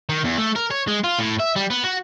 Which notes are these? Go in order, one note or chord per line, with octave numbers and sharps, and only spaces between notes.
D#3
E2
A3
A#4
C#5
G#3
F4
A2
E5
G3
B3
F#4